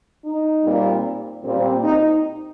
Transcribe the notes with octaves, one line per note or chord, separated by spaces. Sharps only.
D#4
A#2 G3 C4
A#2 G3 C4
D#4